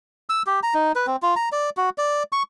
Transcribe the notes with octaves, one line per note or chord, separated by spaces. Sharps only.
E6
G4
A#5
D#4
B4
C4
F4
A#5
D5
F#4
D5
C#6